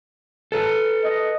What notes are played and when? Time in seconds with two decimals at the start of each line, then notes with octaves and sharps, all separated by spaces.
0.52 A4 B4
1.04 D#5